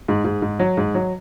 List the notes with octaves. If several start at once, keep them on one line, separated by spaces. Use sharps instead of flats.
G#2
G#2
G#2
F#3
G#2
F#3